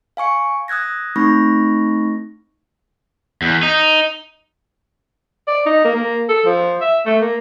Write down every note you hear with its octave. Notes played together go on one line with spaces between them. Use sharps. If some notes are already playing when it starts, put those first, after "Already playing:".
F5 G#5 C#6 C#7
D#6 E6 F#6 G#6 A#6
A3 C4 D#4 B5 C#6 A#6
E2
D#4
D5
D#4
A#3
A#3
A4
F3
E5
A3
A#3